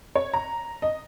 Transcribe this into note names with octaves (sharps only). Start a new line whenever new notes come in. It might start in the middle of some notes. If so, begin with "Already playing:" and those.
C#5
A#5
D#5